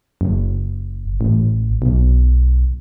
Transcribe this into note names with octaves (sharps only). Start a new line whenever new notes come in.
F#1
A1
B1